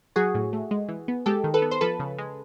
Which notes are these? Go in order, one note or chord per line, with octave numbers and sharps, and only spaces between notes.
F#3 F#4 G#4
A2
A3
G#3
E3
B3
G#3 G4 A4
D#3
A4 B4
B3
C5
F3 A4 B4
C#3
G#3